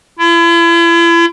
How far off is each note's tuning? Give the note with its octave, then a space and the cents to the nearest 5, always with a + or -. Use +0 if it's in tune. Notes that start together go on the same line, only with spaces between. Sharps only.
E4 +40